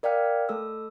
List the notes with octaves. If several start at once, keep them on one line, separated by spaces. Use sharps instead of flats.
A#4 D5 F5 G5 F6
A3 A4 E6